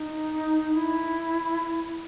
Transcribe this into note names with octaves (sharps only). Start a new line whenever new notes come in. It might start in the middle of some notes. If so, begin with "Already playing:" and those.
Already playing: D#4
E4